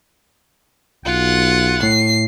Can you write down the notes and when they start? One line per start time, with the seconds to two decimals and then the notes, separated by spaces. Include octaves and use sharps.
1.05 B1 F4 F#5
1.83 A2 C7